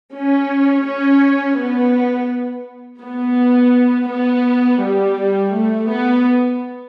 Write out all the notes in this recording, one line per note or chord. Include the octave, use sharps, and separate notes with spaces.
C#4
C#4
B3
B3
B3
G3
A3
B3